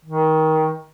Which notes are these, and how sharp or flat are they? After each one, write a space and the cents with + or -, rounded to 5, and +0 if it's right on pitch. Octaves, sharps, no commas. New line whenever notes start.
D#3 +20